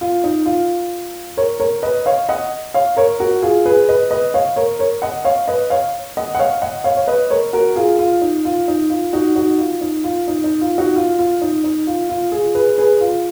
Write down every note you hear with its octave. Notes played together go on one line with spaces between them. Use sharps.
F4
D#4
F4
A#4 C#5
A#4 C#5
B4 D#5
C#5 F5
D#5 F#5
C#5 F5
A#4 C#5
F#4 A#4
F4 G#4
G#4 B4
B4 D#5
B4 D#5
C#5 F5
A#4 C#5
A#4 C#5
D#5 F#5
C#5 F5
B4 D#5
C#5 F5
D#5 F#5
F#5
C#5 F5
D#5 F#5
C#5 F5
C#5
B4 D#5
A#4 C#5
F#4 A#4
F4 G#4
F4
D#4
F4
D#4
F4
D#4 F#4
D#4 F#4
F4
D#4
F4
D#4
D#4
F4
D#4 F#4
F4
F4
D#4
D#4
F4
F4
F4 G#4
G#4 B4
G#4 B4
F4